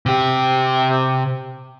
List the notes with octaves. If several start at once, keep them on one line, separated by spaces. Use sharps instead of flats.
C3 G4